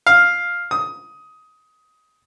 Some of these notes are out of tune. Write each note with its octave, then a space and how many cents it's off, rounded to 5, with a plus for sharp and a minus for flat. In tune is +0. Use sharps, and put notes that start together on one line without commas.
F5 +5
D#6 +15